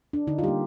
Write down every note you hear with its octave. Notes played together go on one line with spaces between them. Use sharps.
D4
D3 D#4
F4
G3 A#3 G4